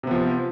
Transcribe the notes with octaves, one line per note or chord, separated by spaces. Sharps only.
C3 F3 B3